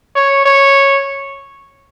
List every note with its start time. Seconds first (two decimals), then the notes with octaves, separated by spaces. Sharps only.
0.16 C#5
0.46 C#5